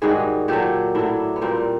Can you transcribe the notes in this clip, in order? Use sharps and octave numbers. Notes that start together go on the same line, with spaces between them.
G#2 D#3 G3 F#4 G#4
A#2 F#3 G4 A4
A2 F#3 D4 E4
B3
A#2 G3 A#3 C4